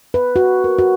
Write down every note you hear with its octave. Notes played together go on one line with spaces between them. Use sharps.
B4
F#4
A#4
F#4